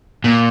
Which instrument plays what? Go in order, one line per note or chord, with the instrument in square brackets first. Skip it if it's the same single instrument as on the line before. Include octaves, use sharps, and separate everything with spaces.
[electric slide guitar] A#2